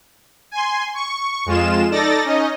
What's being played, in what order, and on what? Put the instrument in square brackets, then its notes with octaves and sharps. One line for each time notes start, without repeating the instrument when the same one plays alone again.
[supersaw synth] G#5 C6
C#6
F2 G#3 F4 E7
D#4 A4 D5 A6 A#6
C#4 D#4 D#5